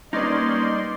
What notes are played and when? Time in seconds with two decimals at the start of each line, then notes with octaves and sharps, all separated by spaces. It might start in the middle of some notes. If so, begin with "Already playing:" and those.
0.13 G3 A#3 C#4 D#4 B4 D5 D#5 C6